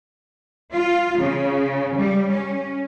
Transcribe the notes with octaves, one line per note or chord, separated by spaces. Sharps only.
F4
C#3
G3
C#4